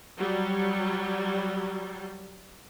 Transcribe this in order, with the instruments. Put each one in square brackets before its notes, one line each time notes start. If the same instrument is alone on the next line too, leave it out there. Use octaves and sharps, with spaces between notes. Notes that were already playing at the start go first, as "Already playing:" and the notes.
[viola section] F#3 G3